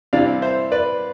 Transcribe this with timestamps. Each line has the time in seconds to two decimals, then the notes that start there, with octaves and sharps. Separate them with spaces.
0.13 C3 E3 G3 D5 F5
0.42 C5 E5
0.72 B4 D5